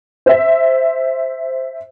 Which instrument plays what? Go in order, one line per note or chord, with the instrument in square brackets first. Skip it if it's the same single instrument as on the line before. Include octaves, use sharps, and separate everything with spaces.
[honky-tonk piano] C5 E5